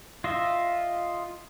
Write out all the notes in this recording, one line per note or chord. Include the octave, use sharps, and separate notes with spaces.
F4 D#5 E5